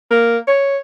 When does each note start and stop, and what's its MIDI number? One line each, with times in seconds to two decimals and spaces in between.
0.11 0.38 58
0.48 0.78 73